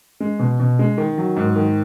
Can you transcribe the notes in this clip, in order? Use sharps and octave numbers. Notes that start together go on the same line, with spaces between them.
G#3
B2
B2
G#3
D#3
F#3
G#2
D#3